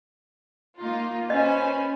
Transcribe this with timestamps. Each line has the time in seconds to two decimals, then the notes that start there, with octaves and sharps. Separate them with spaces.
0.79 A#3 D#4 F4
1.30 C#4 B4 C5 D#5 G#5